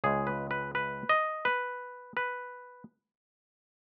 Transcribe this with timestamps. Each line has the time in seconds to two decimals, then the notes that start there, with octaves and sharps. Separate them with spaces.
0.04 C#2 C#3 G#3 G#4
0.27 B4
0.51 B4
0.75 B4
1.09 D#5
1.45 B4
2.17 B4